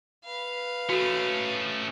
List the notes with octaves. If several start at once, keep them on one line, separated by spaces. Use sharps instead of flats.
B4 F5
A3 C#4 F#4 A4